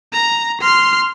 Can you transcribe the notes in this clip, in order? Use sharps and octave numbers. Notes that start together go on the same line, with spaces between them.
A#5
C6 F6